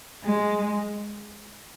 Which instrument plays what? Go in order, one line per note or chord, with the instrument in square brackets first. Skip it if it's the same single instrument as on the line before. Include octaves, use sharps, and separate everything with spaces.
[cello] G#3